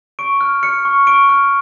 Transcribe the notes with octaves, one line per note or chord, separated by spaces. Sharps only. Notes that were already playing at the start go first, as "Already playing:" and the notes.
C#6 D7
F6
F6 C#7
C#6
C#6 D7
F6